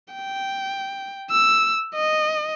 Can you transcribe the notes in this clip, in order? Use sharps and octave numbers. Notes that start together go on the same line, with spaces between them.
G5
E6
D#5